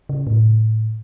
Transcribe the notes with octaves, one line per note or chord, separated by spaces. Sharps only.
C#3
A2